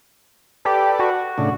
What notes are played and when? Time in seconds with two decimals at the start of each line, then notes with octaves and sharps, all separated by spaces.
0.65 G4 A4 B4 D5
0.99 F#4
1.38 A2 C#3 D4